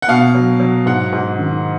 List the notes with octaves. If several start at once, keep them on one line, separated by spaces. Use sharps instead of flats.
F#5
B2 F5
F#3
F#3
G#2 F#5
G#2
D#3